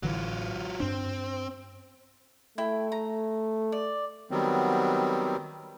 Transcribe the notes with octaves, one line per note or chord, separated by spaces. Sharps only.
A1 D3 E3 F#3 F4
G2 C4 D4
A3 E4 G5
A#5
D5
D#3 F#3 G3 B3 C4